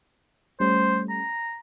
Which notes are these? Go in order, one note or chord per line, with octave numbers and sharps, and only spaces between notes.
G3 A3 C#4 C5
A#5